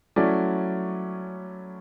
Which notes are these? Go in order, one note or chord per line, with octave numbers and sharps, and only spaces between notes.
F#3 A3 C#4 E4 D5